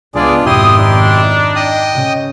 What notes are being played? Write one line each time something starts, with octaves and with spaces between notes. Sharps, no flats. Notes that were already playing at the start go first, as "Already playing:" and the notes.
C#2 G#3 B3 D4 F4 G#4 D5
G#1 F2 B2 E4 G4 C6 D#6
D4 D#4
D#5 G5 D#6
C#3